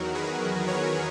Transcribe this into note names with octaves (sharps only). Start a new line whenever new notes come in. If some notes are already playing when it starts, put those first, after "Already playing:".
Already playing: E2 D#3 F#3 F#4 A#4
G#4 B4
A#4 C#5